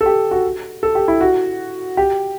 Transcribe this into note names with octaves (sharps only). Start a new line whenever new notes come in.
A4
G4
F#4
A4
G4
E4
F#4
G4